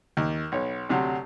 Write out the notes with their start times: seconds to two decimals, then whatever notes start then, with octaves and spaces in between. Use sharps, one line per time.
0.17 D#2
0.52 B1 C#5
0.89 D2 C3 F#3